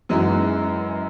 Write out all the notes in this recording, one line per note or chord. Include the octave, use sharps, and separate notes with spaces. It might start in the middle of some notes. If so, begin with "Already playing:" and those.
F#2 E3 G#3 D#4 F#4